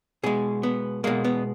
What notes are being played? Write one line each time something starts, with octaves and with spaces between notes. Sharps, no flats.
B2 G#3 G#4
B3
B2 G#3 A#3
B3